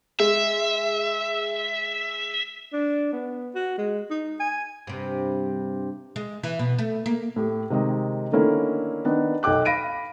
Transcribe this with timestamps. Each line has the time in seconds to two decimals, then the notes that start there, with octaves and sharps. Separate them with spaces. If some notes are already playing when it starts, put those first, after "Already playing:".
0.20 G#3 E5
2.73 D4
3.13 B3
3.55 F#4
3.78 G#3
4.10 D#4
4.40 G#5
4.87 G2 C3
6.16 G#3
6.43 E3
6.59 B2
6.79 A3
7.06 A#3
7.36 A2 G4
7.70 C3 D#3 G#3 D#5
8.32 D3 D#3 A3 A#3 C#4 E4
9.05 D#3 B3 D4
9.43 B1 A4 G5 D6 F#6
9.65 F5 B5 A#6 D7 D#7